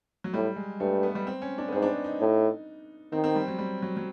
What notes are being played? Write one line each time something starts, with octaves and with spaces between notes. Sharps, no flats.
F#3
A2 G3
G#3
G2 A3
B3
G3
C4
C#4
D4
B3
G#2 C4
D4
D#4
D#4
A2
D#3 C4
C4
G3
F#3
G3
F#3
F#3